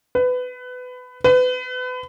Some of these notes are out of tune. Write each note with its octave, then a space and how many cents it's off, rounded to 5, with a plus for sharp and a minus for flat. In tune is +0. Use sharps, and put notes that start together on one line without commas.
B4 +20
B4 +30